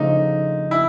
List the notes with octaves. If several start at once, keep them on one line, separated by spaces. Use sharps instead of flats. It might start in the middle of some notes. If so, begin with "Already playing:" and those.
Already playing: C#3 F3 A3 D4 D#4
E4